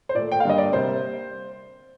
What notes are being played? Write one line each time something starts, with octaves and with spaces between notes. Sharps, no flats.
C5
A#2 A3 D5
G5
F5
G2 D3 G3 A#3 D#5
D5
C3 G3 A#3 C5